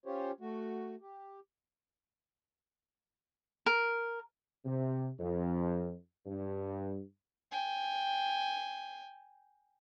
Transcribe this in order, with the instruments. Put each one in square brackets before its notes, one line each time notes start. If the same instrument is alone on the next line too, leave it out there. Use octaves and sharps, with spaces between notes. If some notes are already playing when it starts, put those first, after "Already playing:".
[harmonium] C#4 F4 G4 C5 C#5
A3 F#4
G4
[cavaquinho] A#4
[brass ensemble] C3
F2
G2
[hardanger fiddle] G5 G#5